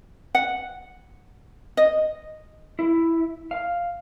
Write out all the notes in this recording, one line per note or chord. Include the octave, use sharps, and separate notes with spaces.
F#5
D#5
E4
F5